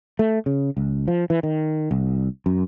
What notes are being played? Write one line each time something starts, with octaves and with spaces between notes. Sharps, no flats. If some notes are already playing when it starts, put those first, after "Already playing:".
A3
C#3
C#2
F3
E3
D#3
C2
F#2